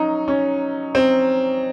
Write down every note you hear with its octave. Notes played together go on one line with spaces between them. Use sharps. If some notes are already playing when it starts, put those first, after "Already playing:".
Already playing: F#3 C#4 D#4
C#4
C4